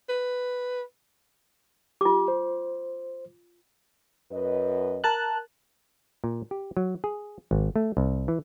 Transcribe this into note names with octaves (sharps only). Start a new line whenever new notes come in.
B4
F4 G4 D6
C5
F#2 B4 D#5
A#4 A5 F#6
A#2
G4
F#3
G#4
G#1
A3
C2
E3